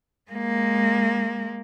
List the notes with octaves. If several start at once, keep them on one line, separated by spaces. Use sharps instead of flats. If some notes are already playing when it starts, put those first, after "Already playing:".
G#3 A#3